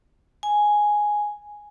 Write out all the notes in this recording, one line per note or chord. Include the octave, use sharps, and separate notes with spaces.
G#5